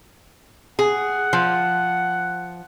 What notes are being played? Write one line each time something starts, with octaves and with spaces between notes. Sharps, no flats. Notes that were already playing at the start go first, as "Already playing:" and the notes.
G#4 F#5
F3